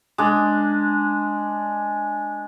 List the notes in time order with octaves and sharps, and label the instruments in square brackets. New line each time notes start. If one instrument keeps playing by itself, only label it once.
[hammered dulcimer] G#3 D4